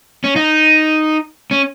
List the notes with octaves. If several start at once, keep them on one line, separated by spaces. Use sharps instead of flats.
C#4
D#4
C#4